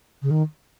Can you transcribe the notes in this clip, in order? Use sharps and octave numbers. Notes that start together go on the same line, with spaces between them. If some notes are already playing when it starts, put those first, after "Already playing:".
C#3
D#3